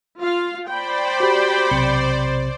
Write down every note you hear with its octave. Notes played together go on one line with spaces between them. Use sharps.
F4 F5
C5 D5 G5 B5
F#4 G4
B1 C3 C#7